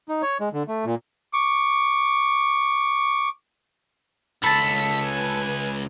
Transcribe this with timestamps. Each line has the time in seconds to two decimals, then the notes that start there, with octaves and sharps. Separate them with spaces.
0.09 D#4
0.22 C#5
0.40 G#3
0.53 D3
0.68 A3
0.85 A#2
1.33 C#6 D6
4.43 C#2 A4 A5 B5 B6
5.05 B4 G#5